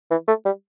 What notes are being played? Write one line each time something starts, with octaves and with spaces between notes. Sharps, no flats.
E3
A3
G3